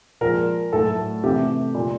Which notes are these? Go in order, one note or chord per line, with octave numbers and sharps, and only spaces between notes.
A#2 F3 G#3 A#4
A2 F#3 A3 A4
C3 E3 A3 G4
A#2 G3